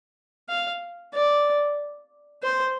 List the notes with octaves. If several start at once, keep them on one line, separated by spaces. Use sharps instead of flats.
F5
D5
C5